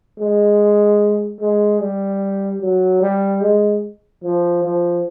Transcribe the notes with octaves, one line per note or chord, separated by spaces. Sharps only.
G#3
G#3
G3
F#3
G3
G#3
F3
F3